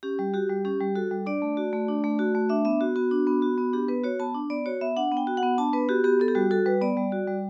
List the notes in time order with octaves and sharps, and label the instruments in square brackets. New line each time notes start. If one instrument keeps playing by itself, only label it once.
[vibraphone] C#4 G4
G3
F#4 G4
G3
C#4 G4
G3
F#4 A4
G3
D4 D5
A3
F#4
A3
D4
A3
F#4
A3
D4 E5
B3 E5
F#4
B3 F#4
D4
B3
F#4
B3
D4 G4
B3 B4
F#4 C#5
B3 A5
D4
B3 D5
F#4 C#5
B3 E5
D4 F#5
B3
G5
F#4
F#5
B3
D4 A5
B3 B4
F#4 G4
B3 G4
B3 A4
G4
G3 F#4
F#4 A4
G3 B4
B3 D5
G3
F#4
G3